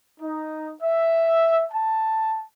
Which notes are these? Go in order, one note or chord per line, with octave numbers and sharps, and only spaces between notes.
D#4
E5
A5